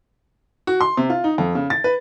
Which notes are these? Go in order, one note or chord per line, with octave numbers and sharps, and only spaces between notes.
F#4
C6
C3
F4
D#4
F2
C#3
A6
B4